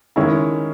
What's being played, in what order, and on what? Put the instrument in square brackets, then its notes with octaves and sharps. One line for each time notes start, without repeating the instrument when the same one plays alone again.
[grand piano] D#3 G#3 C#4 E4